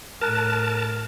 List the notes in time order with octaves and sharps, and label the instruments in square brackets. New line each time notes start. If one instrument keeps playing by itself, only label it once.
[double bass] A2 [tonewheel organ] A#4 A5 [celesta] F6 F#6